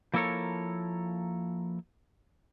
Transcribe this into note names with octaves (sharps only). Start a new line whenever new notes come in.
F3 A#3 E4 A4 A#4 C#5